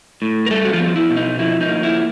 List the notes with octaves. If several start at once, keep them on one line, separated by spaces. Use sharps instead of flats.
A2
A#4
G3 A3 A4
F#4
F3 F4
B3
E4
B2
D#4
F3 E4
D#4
A#3
E4